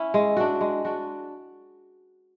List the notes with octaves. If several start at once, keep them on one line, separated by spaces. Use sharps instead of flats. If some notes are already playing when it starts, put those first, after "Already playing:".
Already playing: C#4 E4
G#3
D4 F#4
G#3
D4 F#4